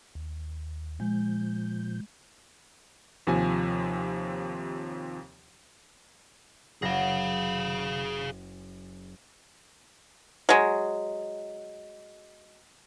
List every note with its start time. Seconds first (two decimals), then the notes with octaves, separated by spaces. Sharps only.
0.15 D#2
1.00 A#2 F3 G#3 G6
3.27 D#2 C3 F3 G#5
6.82 F#1 G#4 F5 A#6
10.49 F#3 G#3